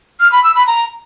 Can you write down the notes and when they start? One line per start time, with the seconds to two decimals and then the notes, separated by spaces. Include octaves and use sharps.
0.20 F6
0.32 B5
0.43 E6
0.55 B5
0.67 A#5